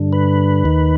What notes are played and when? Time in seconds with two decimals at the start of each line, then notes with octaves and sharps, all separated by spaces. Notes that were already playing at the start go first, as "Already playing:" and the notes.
Already playing: G2 D3
0.13 B4
0.64 D#2 D#3